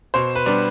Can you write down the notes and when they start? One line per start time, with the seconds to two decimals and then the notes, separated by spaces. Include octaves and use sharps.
0.14 B2 C5
0.35 B4
0.46 G3 B3 D4